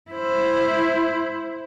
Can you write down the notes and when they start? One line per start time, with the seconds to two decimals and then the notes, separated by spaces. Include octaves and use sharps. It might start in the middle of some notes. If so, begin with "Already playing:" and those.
0.11 E4 C5